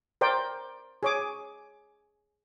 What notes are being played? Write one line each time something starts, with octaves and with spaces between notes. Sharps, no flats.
A#4 C5 D5 G5
G#4 C#5 D6